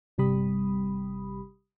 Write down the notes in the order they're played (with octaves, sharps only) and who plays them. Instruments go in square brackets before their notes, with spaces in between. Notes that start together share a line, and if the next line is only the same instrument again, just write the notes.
[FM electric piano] G1 C3 G3 G4 B5 D#6